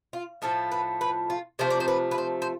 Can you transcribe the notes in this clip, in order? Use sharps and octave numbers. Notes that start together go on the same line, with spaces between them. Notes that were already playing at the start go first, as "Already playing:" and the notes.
F4
A2 F3 A3 A4
B4
B4
F4
C3 F3 A3 C5
D5
C5
B4
B4
C5
C5